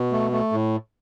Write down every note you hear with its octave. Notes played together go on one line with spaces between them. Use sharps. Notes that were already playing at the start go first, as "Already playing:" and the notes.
Already playing: B2
A3
A3
A2